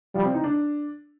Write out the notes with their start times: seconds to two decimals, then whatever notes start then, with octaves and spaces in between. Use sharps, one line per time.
0.15 F3 G3
0.24 C4
0.34 D#4
0.44 D4